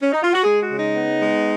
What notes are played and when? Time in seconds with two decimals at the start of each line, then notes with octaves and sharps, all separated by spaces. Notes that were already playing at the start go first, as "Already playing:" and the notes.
0.02 C#4
0.12 D#4
0.23 F4
0.33 F#4
0.43 G#3 G#4
0.62 F#4
0.69 C#3
0.78 D#4
0.95 B3
1.22 G#3